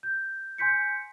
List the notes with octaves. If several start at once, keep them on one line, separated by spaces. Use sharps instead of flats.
G6
G#5 C6 G6 B6 C#7